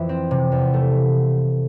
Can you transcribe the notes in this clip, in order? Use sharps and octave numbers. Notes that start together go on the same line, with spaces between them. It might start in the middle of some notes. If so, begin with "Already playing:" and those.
Already playing: F2 E3
C4
C3
E2
A3